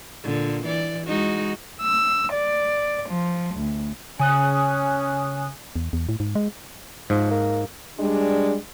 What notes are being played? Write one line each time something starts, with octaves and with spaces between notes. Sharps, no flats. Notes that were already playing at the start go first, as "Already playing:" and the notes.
A#2 D3
E3 D5
G#3 D#4 F#4
E6
D5
F3
D2
C#3 C#4 G#5 D#6 F#6
E2
E2
A2
G#2
G#3
G#2 F3
A#3
G3 G#3 D4